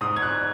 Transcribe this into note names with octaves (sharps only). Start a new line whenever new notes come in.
G#2 D#6
G#6
F#6